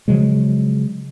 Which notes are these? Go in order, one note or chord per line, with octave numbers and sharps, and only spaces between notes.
C#3 F3 F#3 G#3